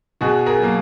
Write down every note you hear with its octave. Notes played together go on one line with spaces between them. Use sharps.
B2 F#4 G#4
G#4 A#4
F#3 A#3